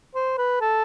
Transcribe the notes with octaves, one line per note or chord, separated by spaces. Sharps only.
C5
B4
A4